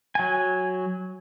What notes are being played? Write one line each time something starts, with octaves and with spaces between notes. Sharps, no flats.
F#3 G#5